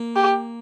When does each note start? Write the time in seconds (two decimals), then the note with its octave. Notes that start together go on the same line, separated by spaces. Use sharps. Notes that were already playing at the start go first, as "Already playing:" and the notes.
Already playing: A#3
0.16 G4